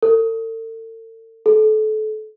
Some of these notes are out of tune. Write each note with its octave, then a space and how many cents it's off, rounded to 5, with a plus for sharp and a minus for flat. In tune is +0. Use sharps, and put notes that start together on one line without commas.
A4 +40
A4 -30